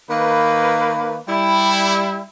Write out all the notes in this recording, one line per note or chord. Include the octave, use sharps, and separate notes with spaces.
D#3 A#3 B4
G3 E4